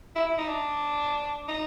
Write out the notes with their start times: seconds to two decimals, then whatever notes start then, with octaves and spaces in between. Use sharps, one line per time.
0.16 E4
0.27 E4
0.38 D#4
0.49 D4
1.48 D#4